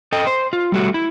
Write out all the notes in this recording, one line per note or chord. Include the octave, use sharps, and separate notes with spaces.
A4 D#5 G5
C5
F4
G3 A3 F#4
E4